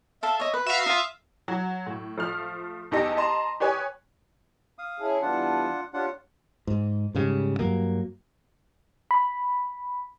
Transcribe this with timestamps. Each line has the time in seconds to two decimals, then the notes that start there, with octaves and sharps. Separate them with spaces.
0.23 A4 E5 F5
0.40 C#5 D#5
0.54 B4
0.66 F#4 E5 F5
0.86 D#4 F4 D#6 E6
1.48 F#3
1.86 A2
2.18 F3 A3 F6
2.91 E2 D#4 G4 A4 D#5
3.17 D#5 A5 A#5 C6
3.60 G4 B4 C#5 G#5 D#6
4.78 F5 D#6
5.00 C#4 E4 G#4 A5
5.22 E3 G3 B3 D4 F4 F#5
5.94 D4 F4 G4 C#5 F#5
6.67 G#2
7.15 G#2 C#3 G3
7.59 G2 F#3 A#3
9.11 B5